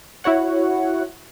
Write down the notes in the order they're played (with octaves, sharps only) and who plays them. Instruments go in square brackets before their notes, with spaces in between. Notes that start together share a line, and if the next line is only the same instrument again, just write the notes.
[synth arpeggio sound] E4 F#4 C#5 F#5